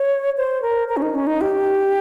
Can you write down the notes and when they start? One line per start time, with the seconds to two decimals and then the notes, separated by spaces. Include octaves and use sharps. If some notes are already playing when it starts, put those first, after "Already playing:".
Already playing: C#5
0.37 C5
0.62 A#4
0.88 A#4
0.97 C#4
1.02 D#4
1.15 C#4
1.27 D#4
1.41 G4